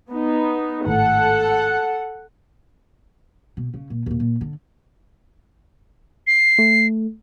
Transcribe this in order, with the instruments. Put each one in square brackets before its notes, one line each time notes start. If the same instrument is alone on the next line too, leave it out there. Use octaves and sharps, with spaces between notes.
[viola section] B3 D#4
[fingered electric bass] G#1 A2 [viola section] A4 F#5
[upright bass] B2
C#3
A#2
D#2 A#2
A#2
D3
[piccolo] C7
[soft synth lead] A3